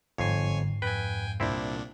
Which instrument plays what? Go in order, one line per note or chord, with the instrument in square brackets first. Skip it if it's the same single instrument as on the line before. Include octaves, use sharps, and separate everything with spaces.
[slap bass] G1 [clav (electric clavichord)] F2 [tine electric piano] G#2 C7 [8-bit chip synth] C#5 G#5
[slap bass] F2 [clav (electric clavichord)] B4 [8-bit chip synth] G5 G#5
[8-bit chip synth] C2 A#2 D4 [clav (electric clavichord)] C4 E4